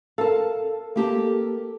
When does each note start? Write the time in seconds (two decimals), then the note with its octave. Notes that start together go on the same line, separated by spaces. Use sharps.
0.18 A4 A#4 F5 A5
0.96 A#3 G4 A5